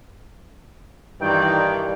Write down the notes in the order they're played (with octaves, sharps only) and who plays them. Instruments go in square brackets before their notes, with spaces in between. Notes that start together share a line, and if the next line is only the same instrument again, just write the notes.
[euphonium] G2 [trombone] D#3 [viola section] E3 D#4 D5 [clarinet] G5